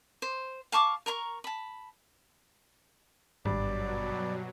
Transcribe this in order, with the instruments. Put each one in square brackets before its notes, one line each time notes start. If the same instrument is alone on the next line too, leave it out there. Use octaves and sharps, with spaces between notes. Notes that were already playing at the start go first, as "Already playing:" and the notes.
[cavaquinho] C5
F5 A5 C#6 D6
A#4 A#5 B5 C#6
A5 B5
[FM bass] G#1 [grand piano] G2 [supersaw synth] B2 F#3 [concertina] D5